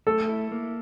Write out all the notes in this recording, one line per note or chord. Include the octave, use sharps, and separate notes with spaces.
A3 A4
E4
A#3